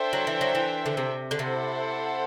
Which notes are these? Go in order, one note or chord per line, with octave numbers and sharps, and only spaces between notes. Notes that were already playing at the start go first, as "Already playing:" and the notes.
Already playing: D4 A4 C5 E5 G5
F#3
E3
F#3
E3
D3
C3
D3
C3 E4 A4 C5 F#5